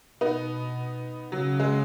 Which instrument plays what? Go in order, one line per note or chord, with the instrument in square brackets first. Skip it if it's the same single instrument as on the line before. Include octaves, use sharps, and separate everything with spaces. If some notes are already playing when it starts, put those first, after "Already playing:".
[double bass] B2 [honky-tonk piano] B3 D#4
[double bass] C#3 [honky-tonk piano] F#3
[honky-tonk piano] G#3